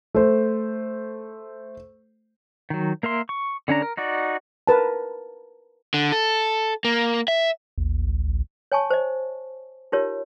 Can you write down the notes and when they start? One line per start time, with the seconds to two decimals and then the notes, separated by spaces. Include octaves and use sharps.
0.14 A3 C5
2.70 D#3 F#3
3.03 A#3 A#4 E5 C6
3.29 C#6
3.68 D3 C#4 D4 A#5
3.82 A#4
3.97 D#4 F#4 D5
4.67 A#4 B4 A5
5.94 D3
6.12 A4
6.85 A#3
7.28 E5
7.78 A1 D#2
8.09 D2
8.27 A1
8.72 C#5 G#5 A5 C#6
8.90 C5 D#5
9.92 D#4 F4 G4 A#4 C#5